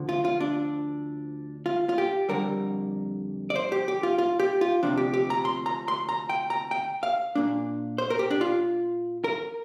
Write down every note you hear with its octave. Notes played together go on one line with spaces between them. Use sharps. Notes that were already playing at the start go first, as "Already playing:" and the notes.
Already playing: D2 D3 F3
F4
F4
D4
F4
F4
G4
F2 D3 G3 A#4
D5
C5
G4
G4
F4
F4
G4
F4
D2 C3 F3 D4
G4
G4
A#5
C6
A#5
C6
A#5
G5
A#5
G5
F5
A#2 A#3 D4
C5
A#4
G4
D4
F4
A#4